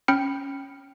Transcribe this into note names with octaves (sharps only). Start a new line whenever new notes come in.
C#4 G5 B5 F6 C#7